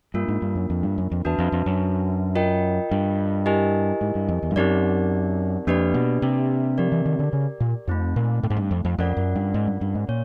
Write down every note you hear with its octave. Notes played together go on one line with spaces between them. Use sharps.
G2 A#3 D4 F4 A#4
G#2
G2
F#2
F2
G2
F#2
F2
E2 D4 F#4 B4 E5 A5
F2
F2
F#2
F4 A#4 D#5 G5
G2
E4 G4 A#4 D#5 G#5
G#2
G2
F2
E2
G2
F#2 C4 D#4 G4 A#4 D5
F2 A#3 D4 G4 B4 D5
B2
C3
F3 G4 A#4 D5
E3
D#3
D3
C#3
A#2
F2 A3 C4 D#4
A#2
A2
G#2
G2
F2
F2
F2 C#4 F4 A#4 D5 F#5
F#2
G2
G#2
G2
G2
G#2
A#2 C#5